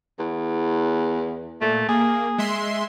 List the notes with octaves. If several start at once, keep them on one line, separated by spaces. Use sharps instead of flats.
E2
A#2 A3
A#3 G#4
G#3 E5 C6